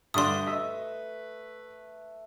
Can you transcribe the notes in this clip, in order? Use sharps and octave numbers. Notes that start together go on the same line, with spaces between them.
G2 D3 A3 D4 B4 C6 D#6
D#5 E5